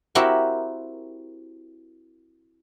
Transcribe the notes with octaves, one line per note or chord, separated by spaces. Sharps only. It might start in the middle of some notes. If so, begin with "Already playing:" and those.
C4 E4 F#4 G4 A#4